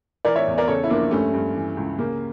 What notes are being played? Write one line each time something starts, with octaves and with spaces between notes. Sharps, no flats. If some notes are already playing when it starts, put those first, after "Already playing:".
E3 A#4 D5
C#5 E5
E2
A#4 D5
C#3 A4 C#5
E4
F3 A#3 D4
G2 A3 C#4
G2
E3
C#2
C#3 A#3